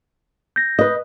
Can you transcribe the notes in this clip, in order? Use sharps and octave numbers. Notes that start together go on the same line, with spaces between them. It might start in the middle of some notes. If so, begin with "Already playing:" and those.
G6 A#6
B4 D#5